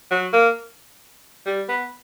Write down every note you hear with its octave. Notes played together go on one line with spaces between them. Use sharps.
F#3
A#3
G3
B3